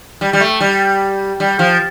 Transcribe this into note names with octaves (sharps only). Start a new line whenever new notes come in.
G3
G3
A3
G3
G3
F3